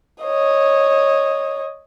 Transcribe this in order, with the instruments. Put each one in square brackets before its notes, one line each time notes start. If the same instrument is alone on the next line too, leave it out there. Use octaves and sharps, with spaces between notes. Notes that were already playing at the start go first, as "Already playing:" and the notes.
[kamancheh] C#5 D#5